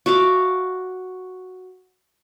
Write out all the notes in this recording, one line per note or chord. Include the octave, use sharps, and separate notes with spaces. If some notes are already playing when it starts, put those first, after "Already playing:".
F#4 E5 F5 D6